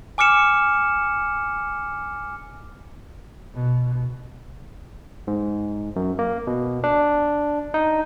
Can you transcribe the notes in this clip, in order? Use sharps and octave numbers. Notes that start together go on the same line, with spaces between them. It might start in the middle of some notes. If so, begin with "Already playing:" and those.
G#5 D6 F6 C#7 E7
B2
G#2
F#2
A#3
B2
D4
D#4